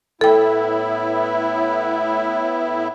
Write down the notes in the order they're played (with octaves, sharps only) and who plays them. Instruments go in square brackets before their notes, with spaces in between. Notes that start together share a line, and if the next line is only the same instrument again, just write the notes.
[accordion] A2 B3 E4 [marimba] A4 G5